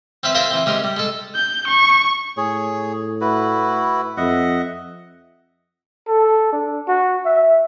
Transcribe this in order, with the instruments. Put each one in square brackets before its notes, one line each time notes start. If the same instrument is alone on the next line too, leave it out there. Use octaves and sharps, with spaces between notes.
[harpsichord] C4 C#4 B4 E5
F4 G#4 A#4 C5 E5 A#5
E3 C4
C3 G#3 C#4 A#4
G3
G#3 A4
[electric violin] G6
C#6
[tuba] A2 [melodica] G#4 C#5
[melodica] E4 F#4 B4
[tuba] F2 [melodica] D#5 E5 F#5
[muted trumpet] A4
D4
F#4
E5